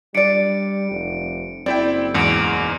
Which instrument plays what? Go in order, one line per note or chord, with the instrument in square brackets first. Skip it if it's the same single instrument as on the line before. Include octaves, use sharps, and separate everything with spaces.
[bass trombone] G3 [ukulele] D4 D5 [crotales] C#7 D7
[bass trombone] F1
[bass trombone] F#1 [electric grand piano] C4 E4 G5 [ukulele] D5
[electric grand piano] E2 G#2 [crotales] C#7 D7